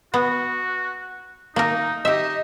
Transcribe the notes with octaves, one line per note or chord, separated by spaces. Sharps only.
B3 F#4
A#3 D#4 A#4
D#4 G4 D#5 E5